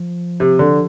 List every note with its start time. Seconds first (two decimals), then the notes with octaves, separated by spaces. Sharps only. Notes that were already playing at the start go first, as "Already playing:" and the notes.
Already playing: F3
0.40 C3
0.59 D3